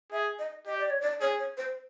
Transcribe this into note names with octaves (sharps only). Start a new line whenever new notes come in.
G#4 E5
D#5
G4 D#5
D5
C#5
D5
G#4 C#5
C#5
C5